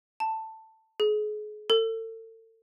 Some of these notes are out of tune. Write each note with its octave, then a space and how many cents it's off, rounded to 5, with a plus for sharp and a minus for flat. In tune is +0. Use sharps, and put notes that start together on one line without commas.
A5 +10
G#4 +35
A4 +40